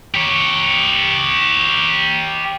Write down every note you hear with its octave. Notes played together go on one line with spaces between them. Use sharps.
G4 C#5